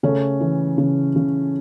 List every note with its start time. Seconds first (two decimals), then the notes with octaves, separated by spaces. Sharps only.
0.03 C#3 A3 C#4
0.40 E3
0.78 C#3
1.16 C#3